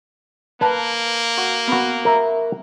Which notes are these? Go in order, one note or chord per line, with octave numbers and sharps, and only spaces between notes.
A#3 B4 A5
F#4
B3 F#4
A#4 E5